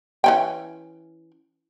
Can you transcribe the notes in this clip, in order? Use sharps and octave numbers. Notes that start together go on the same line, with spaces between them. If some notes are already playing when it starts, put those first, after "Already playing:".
E3 C#4 G5